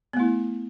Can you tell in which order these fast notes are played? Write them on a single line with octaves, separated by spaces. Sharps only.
B3 A3 E4